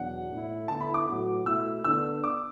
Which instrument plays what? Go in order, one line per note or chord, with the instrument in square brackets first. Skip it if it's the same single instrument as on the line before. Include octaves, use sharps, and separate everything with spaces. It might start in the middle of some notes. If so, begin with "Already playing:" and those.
Already playing: [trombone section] E2 B2 F#3 D4 [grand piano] F#5
[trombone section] A2 A3 E4
[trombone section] D3 B3 E4 [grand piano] A5
[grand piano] B5
D6
[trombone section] A2 F#3 B3 F#4
[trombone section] B2 A3 E4 [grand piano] E6
[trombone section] D3 B3 D4 [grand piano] E6
[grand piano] D6